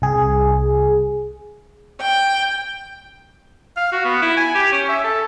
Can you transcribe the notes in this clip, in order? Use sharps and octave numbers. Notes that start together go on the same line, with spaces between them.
C2 G#4
G5
F5
F#4
B3
E4
G#5
G4
C#4
E5
A4